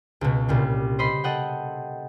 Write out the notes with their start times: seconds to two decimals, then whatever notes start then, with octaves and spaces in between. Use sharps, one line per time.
0.21 C#2 B2
0.48 C2 A#2 C#3
0.99 C5 D#5 B5 C6
1.24 A4 D#5 F#5 G5